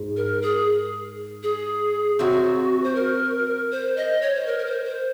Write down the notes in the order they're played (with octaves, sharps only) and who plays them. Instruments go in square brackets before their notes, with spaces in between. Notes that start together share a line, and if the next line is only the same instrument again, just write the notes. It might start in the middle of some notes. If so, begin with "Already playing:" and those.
Already playing: [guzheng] G#2
[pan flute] A#4
G#4
G#4
[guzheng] C3 F#3 C4 [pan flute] F#4
[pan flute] C5
A#4
C5
D#5
C#5
C5
A#4
A#4
C5
C5